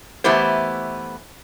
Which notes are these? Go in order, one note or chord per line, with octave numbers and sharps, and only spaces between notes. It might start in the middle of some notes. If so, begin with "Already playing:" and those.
E3 A3 B3 E4 G4 C5